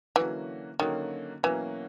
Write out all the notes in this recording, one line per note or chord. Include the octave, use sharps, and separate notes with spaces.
D3 E3 F#3 A#3 C#4 F#4
D3 D#3 F#3 A#3 C#4 F#4
B2 E3 F#3 A#3 C#4 F#4